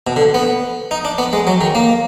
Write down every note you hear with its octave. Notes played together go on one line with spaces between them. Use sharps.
B2
D3
B3
D#4
D4
B3
G#3
F#3
D#3
A#3